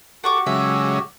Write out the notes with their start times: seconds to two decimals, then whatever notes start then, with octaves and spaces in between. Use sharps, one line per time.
0.24 F#4 G4 A4 F#5 C#6 D6
0.46 C#3 F#3 G#3 E5